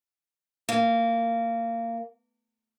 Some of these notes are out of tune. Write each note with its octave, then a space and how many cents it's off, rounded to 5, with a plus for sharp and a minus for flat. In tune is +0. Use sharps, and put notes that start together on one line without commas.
A#3 -20